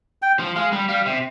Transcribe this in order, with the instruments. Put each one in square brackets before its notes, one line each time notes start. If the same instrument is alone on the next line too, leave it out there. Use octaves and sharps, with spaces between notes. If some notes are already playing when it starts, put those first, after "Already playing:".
[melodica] G5
[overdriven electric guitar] F3
[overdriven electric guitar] G#3 [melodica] F5
[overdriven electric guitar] G3
[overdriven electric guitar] G3 [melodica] F5
[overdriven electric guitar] C3